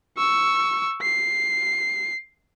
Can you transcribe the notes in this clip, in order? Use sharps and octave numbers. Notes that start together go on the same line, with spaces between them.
C#6 E6
C7